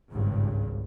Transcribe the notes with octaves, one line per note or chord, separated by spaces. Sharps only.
G#1 C#2 G2